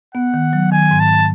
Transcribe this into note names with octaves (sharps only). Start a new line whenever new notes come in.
B3 F#5
D#3
F#3
D#3 G#5
G#2
A5